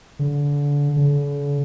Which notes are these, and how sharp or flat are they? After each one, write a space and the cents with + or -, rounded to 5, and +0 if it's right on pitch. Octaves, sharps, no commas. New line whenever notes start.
D3 -30
D3 -45